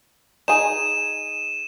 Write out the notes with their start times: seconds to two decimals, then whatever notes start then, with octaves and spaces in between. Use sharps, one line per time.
0.48 D#4 G#4 D#7 E7